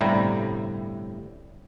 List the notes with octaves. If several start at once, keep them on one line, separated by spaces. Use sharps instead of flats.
G1 A2 C3 G3 E4 A#5